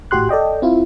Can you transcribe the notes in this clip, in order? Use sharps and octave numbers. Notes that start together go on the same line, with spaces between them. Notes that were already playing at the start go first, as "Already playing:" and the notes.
G#1 A2 F#4 G4 C6 F#6
A4 D5 D#5 G5
C4 E4 F4